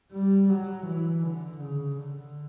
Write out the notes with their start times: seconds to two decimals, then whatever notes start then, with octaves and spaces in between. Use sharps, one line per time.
0.13 G3
0.50 F#3
0.86 E3
1.24 D3
1.61 C#3
1.98 D3